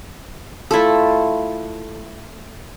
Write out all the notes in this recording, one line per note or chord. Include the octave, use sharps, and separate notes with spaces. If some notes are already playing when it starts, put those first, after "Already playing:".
A3 E4 F4 A4